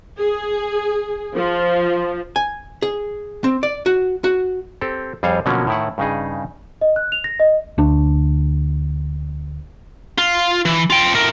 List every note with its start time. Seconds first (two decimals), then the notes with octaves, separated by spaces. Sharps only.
0.20 G#4
1.36 F3
2.36 G#5
2.82 G#4
3.44 C4
3.63 D5
3.86 F#4
4.24 F#4
4.81 C4 G4 A4
5.23 F2 G3 G#4 C5 C#5 F5
5.46 B2 D3 F3 F#3 A#3 C#4
5.67 A2 D#3 E4 F#5
5.98 G2 C#3 D#4 G#4
6.81 D#5
6.96 F#6
7.12 F7
7.24 A#6
7.40 D#5
7.78 D2 D4
10.19 F4
10.65 E3
10.90 F4 G5
11.13 A2 A#4